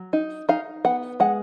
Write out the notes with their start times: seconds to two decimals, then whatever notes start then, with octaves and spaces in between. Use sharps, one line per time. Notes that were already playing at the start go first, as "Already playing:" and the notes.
Already playing: F#3
0.13 D#4
0.49 D#4 F5
0.85 B3 F#5
1.20 G#3 F#5